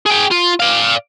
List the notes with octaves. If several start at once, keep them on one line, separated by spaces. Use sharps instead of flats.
G#4 G5
F4
D5 F5